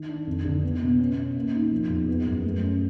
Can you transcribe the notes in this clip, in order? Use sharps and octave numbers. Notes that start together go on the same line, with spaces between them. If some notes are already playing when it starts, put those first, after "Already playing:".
Already playing: D#3
D4
F2
D3
B3
B2
C#4
C#4
A#3
D#4
F3
E2
B3
F#2
A3
C#4